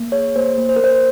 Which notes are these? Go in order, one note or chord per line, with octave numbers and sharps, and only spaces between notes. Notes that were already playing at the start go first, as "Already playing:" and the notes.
Already playing: A#3
G#4 C#5
A#3 C5
A#3
C5
A#4
A#3 C5